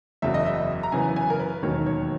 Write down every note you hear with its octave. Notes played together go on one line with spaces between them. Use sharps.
F#1 E2 C#3 F#3 E5
D#5
E5
A#5
F#2 C#3 E3 B3 G#5
G#5
A#4
B4
E1 D#2 D#3 F#3 C#5
C#5